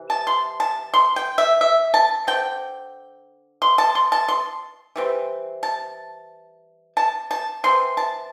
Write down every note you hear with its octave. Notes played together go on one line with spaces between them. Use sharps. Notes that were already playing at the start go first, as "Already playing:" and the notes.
Already playing: C3 E3
A5
C6
A5
C6
G5
E5
E5
A5
D3 C4 G5
C6
A5
C6
A5
C6
E3 G3 C4
A5
A5
A5
E3 C4 C6
A5